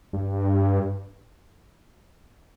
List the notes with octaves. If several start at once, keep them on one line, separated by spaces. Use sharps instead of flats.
G2